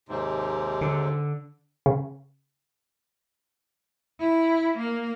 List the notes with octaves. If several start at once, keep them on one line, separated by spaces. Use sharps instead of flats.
D#2 G#2 C3
D3
C#3
E4
A#3